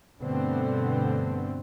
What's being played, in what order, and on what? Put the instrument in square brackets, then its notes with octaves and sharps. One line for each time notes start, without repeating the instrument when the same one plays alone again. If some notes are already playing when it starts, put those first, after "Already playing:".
[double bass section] G2 B2 D3 A3 B3 C4